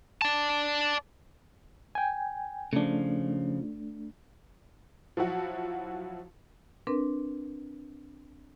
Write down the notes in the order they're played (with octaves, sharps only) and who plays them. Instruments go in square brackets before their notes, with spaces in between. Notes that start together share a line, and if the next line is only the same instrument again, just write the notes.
[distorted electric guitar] D5 A5
[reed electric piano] G5 G#5
[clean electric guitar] C#3 F3 [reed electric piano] A3 D4
[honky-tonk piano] F3 F#3 E4 F#4
[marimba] C4 D4 A#4 B4